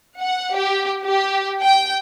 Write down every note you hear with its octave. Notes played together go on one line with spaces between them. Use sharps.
F#5
G4
G4
G5